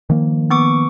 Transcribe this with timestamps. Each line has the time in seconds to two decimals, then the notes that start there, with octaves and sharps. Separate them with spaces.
0.10 D#3 F3 A#3
0.50 B3 C#6 D6